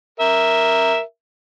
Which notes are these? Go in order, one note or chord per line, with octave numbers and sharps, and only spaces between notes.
A#4 E5